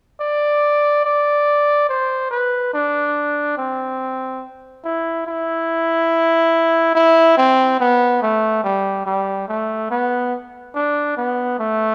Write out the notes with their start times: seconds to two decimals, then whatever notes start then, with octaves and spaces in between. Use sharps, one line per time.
0.20 D5
1.05 D5
1.89 C5
2.31 B4
2.73 D4
3.57 C4
4.84 E4
5.27 E4
6.95 E4
7.38 C4
7.80 B3
8.22 A3
8.64 G3
9.06 G3
9.48 A3
9.90 B3
10.75 D4
11.17 B3
11.59 A3